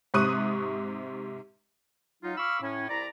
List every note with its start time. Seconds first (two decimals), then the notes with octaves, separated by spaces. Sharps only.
0.14 G#2 C3 C#6 D#6 F#6 D#7
2.22 F#3 D#4 F4
2.37 F5 B5 C#6 D6 E6 F6
2.61 A2 C#4
2.89 C2 E4 D5 A#5